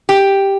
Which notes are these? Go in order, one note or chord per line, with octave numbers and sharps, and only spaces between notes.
G4